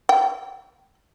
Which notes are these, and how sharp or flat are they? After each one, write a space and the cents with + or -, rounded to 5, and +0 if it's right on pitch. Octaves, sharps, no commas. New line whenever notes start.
G5 -20